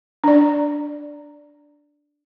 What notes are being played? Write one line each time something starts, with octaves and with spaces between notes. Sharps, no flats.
D4 D5